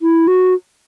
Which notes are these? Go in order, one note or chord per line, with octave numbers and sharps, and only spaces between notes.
E4
F#4